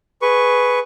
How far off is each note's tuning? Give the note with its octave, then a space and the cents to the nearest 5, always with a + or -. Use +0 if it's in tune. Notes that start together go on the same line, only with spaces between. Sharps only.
G#4 +10 B4 +0 C#6 +0